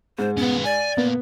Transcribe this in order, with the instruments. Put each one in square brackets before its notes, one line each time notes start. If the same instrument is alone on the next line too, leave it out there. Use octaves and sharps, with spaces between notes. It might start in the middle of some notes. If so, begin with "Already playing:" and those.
[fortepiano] G#2 [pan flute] C5
[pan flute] B3 [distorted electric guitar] C#4 B4
[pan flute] D5 [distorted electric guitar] G#5
[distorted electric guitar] A#2 [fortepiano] B3